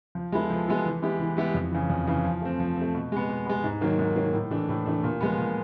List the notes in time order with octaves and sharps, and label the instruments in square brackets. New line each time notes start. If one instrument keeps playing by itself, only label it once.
[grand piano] F3
G#3 B3 E4 A4
F3
G#3 B3 E4 A4
E3
G#3 B3 E4 G4
E3
G#3 B3 E4 G4
F2
C#3 E3
F2
C#3 E3
F3
A3 C4
F3
A3 C4
B2
G#3 B3
B2
G#3 B3
G#2
D#3 F#3 A#3
G#2
D#3 F#3 A#3
A2
E3 A3 D4
A2
E3 A3 D4
A#2
F3 G#3 B3
A#2